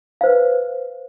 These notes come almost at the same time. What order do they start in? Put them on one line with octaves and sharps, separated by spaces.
F5 C5 B4